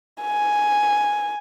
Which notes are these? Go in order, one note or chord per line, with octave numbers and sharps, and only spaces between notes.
G#5